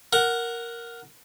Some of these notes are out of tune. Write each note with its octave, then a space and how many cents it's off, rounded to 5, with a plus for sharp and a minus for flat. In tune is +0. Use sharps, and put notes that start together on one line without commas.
A#4 +0 F#5 +0